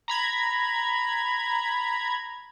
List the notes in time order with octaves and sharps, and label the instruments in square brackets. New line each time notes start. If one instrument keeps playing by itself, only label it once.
[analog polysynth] A#5 B5 G#6